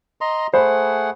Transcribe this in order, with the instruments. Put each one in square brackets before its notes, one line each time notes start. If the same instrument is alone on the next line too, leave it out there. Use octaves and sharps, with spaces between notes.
[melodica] D#5 A#5 C6
[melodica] A3 G#4 F#5 [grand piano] C5 B5